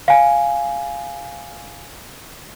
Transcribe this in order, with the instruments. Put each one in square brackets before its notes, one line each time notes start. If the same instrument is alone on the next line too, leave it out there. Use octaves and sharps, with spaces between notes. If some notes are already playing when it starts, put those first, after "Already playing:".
[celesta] F5 G#5